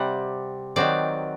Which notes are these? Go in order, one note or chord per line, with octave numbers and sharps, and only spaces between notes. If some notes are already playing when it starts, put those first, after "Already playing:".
Already playing: C3 G3 C4 F#5
D#3 F#3 C4 D5